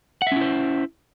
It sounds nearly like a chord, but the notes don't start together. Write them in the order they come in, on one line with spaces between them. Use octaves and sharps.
F#5 E5 C#4 E4 C5